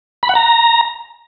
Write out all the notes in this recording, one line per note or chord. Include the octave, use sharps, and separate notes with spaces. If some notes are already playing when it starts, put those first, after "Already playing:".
B5
F#5
A#5